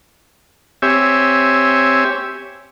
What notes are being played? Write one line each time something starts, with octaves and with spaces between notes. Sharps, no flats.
C4 G4 C#5 E5 G#5